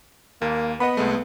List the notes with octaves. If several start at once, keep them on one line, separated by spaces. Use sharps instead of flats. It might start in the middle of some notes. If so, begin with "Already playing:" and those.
D#2 A#3
B3 D#5 F#5 B5
C2 G#3 A3